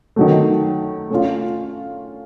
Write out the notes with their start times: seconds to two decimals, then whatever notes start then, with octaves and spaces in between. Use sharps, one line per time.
0.16 D#3 F#3 A3
1.10 A3 C#4 F4